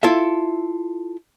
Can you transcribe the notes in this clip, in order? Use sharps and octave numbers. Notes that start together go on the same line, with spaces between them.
E4 F4 A4 E5